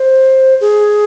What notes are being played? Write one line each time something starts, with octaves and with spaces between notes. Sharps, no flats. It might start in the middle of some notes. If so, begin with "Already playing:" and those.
Already playing: C5
G#4